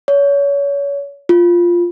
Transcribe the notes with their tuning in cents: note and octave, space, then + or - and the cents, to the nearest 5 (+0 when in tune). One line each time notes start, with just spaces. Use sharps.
C#5 +30
F4 -5